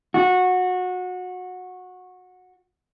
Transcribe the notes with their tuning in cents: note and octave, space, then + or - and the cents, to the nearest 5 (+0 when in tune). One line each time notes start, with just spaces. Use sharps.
F#4 -20